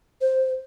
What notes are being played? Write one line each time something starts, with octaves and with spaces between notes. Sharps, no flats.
C5